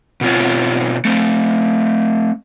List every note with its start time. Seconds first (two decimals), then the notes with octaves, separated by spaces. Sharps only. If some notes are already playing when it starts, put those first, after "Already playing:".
0.21 B2 C4 F4 C#5
1.05 A3 C4